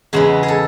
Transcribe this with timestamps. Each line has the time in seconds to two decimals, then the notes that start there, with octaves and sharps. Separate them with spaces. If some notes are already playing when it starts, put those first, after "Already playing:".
0.13 E2 C#3 G#3 B3 G#4
0.43 G#4
0.48 A4